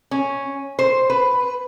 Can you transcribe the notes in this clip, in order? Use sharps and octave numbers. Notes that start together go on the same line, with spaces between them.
C#4
C5
B4